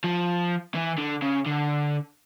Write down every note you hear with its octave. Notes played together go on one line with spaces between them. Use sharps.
F3
E3
D3
C#3
D3